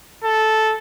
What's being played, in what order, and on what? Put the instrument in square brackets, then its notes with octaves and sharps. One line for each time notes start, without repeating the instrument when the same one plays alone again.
[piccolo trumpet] A4